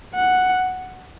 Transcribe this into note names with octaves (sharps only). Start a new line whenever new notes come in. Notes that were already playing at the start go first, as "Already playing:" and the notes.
F#5